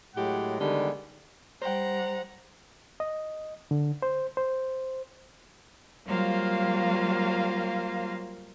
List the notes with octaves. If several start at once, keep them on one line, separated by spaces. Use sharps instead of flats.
A2 F#3 G#3 G4 F#5
D3 D#3 G3 G#3 B3
G3 C5 F#5 G5 A#5
D#5
D3
C5
C5
F#3 G3 A#3 F4 C5 F5